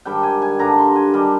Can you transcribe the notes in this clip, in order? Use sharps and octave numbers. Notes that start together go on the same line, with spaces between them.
G#2 D#3 G3 D4 G5
G#5
G#5
G2 D3 G3 D4 A#5
C6
G#5
D#3 G3 D4 D#5